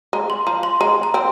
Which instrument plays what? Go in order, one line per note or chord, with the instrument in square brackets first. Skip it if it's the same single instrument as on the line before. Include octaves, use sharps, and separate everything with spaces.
[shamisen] G#3 [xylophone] A#5
[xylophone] C6
[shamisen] F3 [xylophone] A#5
[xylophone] C6
[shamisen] G#3 [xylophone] A#5
[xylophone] A#5
[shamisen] C4